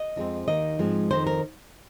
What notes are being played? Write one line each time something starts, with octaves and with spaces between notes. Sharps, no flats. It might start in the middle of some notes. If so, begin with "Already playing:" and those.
Already playing: D#5
F2 F3 G#3 C4
D#2 D#3 A#3 D#5
G#2 F3 G#3 C4
F2 C3 D#3 C4 C5
A#4